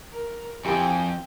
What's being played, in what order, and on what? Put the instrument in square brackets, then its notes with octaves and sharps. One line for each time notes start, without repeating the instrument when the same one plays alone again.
[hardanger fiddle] A#4
[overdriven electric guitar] F2 [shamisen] E4 G4 A#4 [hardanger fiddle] G5 [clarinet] G#5